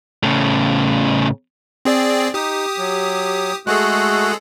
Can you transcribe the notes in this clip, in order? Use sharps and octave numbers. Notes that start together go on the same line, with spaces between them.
A2 C#3
C4 G#4 D5
D#4 G4 D#6
F#3
G#3 A3 F#4 G#4 A4 F#6